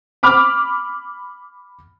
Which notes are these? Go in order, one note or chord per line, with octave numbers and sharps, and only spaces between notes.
B5 D6 F6